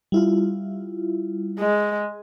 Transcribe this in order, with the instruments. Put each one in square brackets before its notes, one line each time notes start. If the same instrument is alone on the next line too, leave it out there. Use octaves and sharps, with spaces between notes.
[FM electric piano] G3 E4 F4
[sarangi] G#3